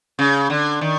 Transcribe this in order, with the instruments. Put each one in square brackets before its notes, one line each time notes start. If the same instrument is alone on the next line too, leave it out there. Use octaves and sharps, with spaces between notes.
[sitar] C#3
D3
D#3